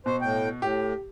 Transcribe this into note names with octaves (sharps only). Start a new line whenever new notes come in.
B2 C5
A2 G5
A2 G4